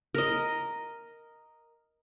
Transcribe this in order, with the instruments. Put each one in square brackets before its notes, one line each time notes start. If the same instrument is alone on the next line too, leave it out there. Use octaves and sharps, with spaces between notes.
[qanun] A#4 D#5